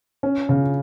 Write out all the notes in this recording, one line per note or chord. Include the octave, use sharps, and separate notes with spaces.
C#4
C#3